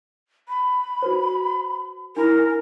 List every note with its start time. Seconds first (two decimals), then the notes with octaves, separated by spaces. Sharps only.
0.48 B5
1.02 F#4 B4 C5
2.16 D4 E4 A#4 B5
2.39 G#5